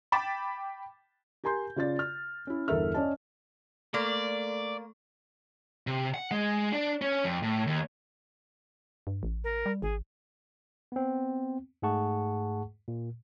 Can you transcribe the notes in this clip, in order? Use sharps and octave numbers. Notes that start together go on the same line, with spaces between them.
G5 B5 D6 A6 E7
G4 A#4 G#5 A#5 C6 G6
C#3 F4 D5 A6
F6
C#4 E4
G1 E2 A4 A#4 E5 F6
C#4 D5 D#5 A5
A3 A#3 A4 D5 C#6
C3
F#5
G#3
D4
C#4
F2
A2
D#2
G2
A1
A#4
G3
G#1 G#4
B3 C4
G#2 A3 G#4 F#5 A5 C#6
A#2